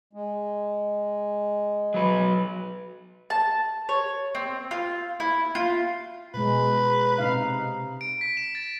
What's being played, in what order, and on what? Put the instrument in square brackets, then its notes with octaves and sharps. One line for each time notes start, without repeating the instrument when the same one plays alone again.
[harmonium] G#3
[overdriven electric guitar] F#3 B4
[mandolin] A5
C#5
C4
F4
E4
F4
[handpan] B2 G#3 [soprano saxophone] B4
[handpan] C3 D#4 F5
[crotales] D7
B6
E7
A6